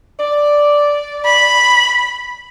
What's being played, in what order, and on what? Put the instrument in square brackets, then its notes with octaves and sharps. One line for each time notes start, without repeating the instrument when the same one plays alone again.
[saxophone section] D5
[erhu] B5